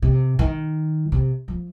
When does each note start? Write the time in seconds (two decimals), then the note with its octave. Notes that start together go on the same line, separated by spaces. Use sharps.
0.02 C3
0.39 D#3
1.12 C3
1.48 F3